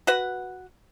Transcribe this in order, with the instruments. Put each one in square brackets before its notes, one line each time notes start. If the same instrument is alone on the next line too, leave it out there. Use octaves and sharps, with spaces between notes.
[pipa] F#4 B4 F#5